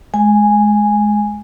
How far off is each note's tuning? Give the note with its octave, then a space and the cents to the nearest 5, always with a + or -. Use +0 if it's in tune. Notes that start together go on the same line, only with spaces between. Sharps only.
G#3 +20 G#5 -5